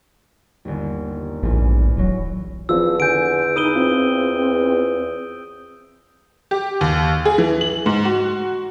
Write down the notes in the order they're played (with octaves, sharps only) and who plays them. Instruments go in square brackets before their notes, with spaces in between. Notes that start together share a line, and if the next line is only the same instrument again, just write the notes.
[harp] G1 D#2
[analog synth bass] A#1 [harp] E2 G#2
[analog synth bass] D1 [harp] E3 F#3
[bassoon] E2 [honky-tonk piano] F3 C4 F4 [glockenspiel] E6
[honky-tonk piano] D3 G#5 [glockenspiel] G6 D7
[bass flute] D#4 [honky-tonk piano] B4 [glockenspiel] D#6 D#7 G7
[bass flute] C4 [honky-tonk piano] F4
[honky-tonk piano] G4
D#2
G#4
E3
F#7
G#2
F#4